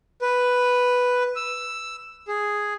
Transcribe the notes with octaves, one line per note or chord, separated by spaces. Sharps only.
B4
E6
G#4